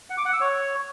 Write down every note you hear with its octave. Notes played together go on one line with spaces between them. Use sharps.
F#5
D6
F#5
E6
C#5